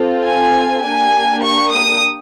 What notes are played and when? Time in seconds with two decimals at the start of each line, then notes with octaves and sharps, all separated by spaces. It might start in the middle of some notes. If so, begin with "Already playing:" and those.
Already playing: C4 F4 A4
0.25 G#5
0.84 A#3 D4 G4 G#5
1.43 C#6
1.73 D#6